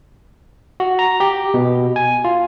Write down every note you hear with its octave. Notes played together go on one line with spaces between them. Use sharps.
F#4
A#5
G4
B2
G#5
F4